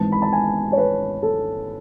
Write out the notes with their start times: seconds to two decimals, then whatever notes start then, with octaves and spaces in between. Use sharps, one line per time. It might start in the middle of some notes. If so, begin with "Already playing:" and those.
Already playing: G#1 G#2 E3 A5
0.12 B5
0.22 A5
0.33 G#5
0.72 C#5
0.78 B4
1.23 A4